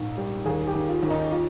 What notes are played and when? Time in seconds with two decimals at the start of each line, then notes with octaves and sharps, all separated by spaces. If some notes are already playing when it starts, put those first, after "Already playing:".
Already playing: A#1 G#2
0.17 G3
0.46 D#2 G#4
0.67 G4
0.75 D#2
0.89 F4
1.03 D#2
1.10 D#4
1.32 F4